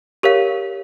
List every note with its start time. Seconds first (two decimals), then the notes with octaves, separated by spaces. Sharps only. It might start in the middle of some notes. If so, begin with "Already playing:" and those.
0.23 G4 A#4 C#5 F5